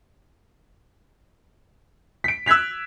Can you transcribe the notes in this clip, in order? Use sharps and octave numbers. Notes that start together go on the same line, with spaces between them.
B6 D7
E6 F#6 G#6 B6 F7